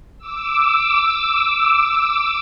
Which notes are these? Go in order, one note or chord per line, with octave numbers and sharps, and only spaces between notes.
D6 E6